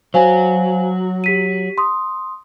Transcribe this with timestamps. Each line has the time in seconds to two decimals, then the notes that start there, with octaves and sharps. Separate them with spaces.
0.14 F#3 F#4 C5 F5 G#5
1.24 G4 B6 D#7
1.78 C6 D#6